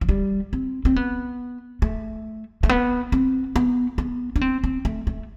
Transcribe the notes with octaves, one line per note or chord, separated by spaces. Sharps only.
F3
G3
C4
C4
B3
A3
A3
B3
C4
B3
B3
D4
C4
C4
A3
A3